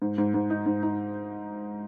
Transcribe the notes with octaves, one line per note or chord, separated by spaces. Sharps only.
G#2
G#2
G#2
D#4
G#2
D#4